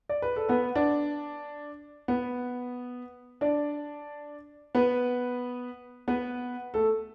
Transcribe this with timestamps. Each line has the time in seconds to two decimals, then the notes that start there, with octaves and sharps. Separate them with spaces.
0.09 D5
0.22 B4
0.36 A4
0.49 B3 B4
0.75 D4 D5
2.08 B3 B4
3.41 D4 D5
4.75 B3 B4
6.08 B3 B4
6.74 A3 A4